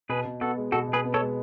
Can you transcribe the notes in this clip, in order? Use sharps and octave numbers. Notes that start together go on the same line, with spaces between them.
B2 G#4 B4
B2
B3 F#4 A4
G#3
B2 F#4 A4
B2
G#4 B4
B3
A4 C#5
G#3